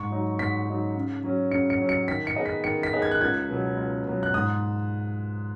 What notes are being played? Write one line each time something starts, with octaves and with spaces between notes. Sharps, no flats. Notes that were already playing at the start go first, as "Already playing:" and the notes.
Already playing: G#2 C#6
F#3 D#4
G#2 B6
F#3 D#4
C#3
F#3 C#4
C#3 C#7
C#7
F#3 C#4
C#7
D#3 B6
C#7
B3 G#4 D#5
B6
D#3 C#7
B6
B3 G#4 D#5
G#6
F#6
C#2 G#6
B2 F#3 B3
C#2
B2 F#3 B3
F#6
G#2 D#6